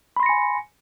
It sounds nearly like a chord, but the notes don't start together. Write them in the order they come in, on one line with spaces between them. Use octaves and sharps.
B5 C6 A#6 C#7 G#5